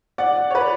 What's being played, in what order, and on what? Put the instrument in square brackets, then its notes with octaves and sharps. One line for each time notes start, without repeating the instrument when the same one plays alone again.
[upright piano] D5 F#5
C#5
B4 D5